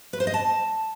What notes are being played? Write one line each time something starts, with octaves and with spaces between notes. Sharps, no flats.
B4
C5
D#5
A5